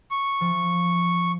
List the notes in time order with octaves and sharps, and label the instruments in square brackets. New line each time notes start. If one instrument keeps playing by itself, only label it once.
[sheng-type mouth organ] C#6
[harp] F3